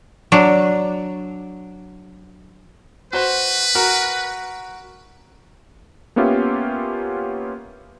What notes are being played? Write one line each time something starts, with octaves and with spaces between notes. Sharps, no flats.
F#3 D4
F#4 B4 C5
F#4 A#4 A#5
A#3 B3 C#4 F4 G4 E5